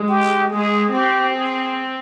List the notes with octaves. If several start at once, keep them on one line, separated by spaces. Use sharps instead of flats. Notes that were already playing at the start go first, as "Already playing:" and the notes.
Already playing: G#3
G4
G#3 G#4
C4 G4
G#4